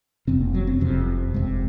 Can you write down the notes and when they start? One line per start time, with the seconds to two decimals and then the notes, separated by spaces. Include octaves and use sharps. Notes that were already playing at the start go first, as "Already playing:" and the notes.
0.27 F1 F2 C3 C4
0.41 A#3
0.54 F#3
0.67 C4
0.80 F1 F2 C3
1.34 F1 F2 C3 G#3